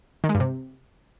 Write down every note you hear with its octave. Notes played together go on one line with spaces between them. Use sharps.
D#3
G#3
G2
C3